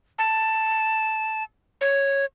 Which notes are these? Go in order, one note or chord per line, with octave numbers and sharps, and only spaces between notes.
A5
C#5